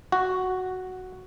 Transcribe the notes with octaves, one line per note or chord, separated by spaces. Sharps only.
F#4